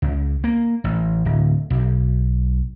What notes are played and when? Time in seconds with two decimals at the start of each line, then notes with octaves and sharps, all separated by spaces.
0.02 C#2
0.44 A#3
0.84 A1
1.25 D1
1.70 B1